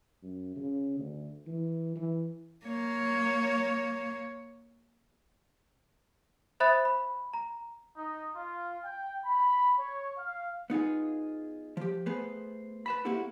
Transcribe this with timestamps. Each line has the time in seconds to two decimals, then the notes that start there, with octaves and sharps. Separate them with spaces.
0.23 F#2
0.56 C#3
0.99 D2
1.47 E3
1.96 E3
2.66 A#3 C#5
6.60 C5 E5 B5 D#6 F#6 A6
6.85 B5
7.33 A#5
7.97 D#4
8.35 F4
8.84 G5
9.25 B5
9.78 C#5
10.17 F5
10.70 B3 D#4 F4 G#4
11.77 F3 G4
12.06 A3 B3 G#4 B4 C5
12.86 B4 A5 B5
13.05 A#3 C4 E4 F#4 G4 A4